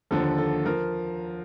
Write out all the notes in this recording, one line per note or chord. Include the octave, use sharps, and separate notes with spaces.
D#2 D3 F3 A4
A4
F3 A#4